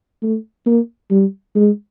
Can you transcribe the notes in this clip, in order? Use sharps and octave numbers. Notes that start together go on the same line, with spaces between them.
A3
A#3
G3
G#3